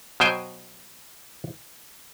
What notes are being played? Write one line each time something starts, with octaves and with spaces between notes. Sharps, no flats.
B2 F#3 C5 G5 G#5